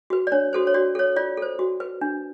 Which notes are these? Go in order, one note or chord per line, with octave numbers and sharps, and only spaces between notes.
F#4 B4
D5
D4 C#5
F#4 A4 C5
C#5
F#4 D5
A4 C#5
F4 D5
A4 C5
F#4
B4
D4